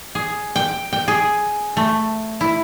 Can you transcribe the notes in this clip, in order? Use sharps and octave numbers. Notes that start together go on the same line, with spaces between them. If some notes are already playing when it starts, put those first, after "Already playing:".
G#4
G5
G5
G#4
A3
E4